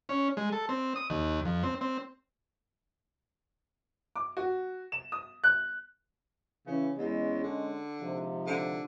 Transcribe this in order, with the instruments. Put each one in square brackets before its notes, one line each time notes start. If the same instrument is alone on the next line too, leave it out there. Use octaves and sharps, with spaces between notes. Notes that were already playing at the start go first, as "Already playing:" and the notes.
[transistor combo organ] C#4
G#3
A4
C4
D#6
D#2
F2
C4
C4
[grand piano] D6
F#4
E7
D#6
F#6
[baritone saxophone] C#3 [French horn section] E3 C#4
[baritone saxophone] E2 [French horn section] G#3 C#4
[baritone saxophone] D3
[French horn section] G#2 C3 F3
[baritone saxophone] D3